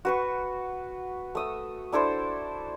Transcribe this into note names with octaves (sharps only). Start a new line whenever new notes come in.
F#4 B4 C#6
A3 D#6 E6
D4 E4 A4 C5